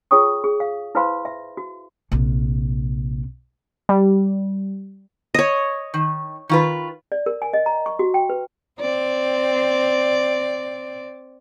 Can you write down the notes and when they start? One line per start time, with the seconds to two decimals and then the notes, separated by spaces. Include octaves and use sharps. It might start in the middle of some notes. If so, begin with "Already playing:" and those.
0.11 F4 G#4 C#5 G5 C#6 D#6
0.44 G#4
0.60 F5
0.95 E4 B4 C5 F5 B5 C6
1.25 E5
1.57 F#4
2.12 A#1 C3
3.89 G3
5.34 C#5 D#5
5.94 D#3
6.49 D#3 F4 B4
7.12 D5
7.26 A#4
7.42 G#5
7.53 D#5
7.66 A#5
7.86 C#6
7.99 F#4
8.14 G5
8.30 B4
8.80 C4 D5